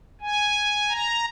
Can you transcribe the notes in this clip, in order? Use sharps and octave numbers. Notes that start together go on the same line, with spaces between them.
G#5
A#5